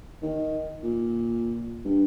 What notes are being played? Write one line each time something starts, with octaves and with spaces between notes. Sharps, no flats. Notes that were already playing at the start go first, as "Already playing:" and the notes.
D#3
A#2
G2